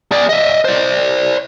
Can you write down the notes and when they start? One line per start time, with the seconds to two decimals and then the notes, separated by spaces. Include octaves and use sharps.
0.12 G#4 D5
0.29 D#5 E5
0.65 C5 D5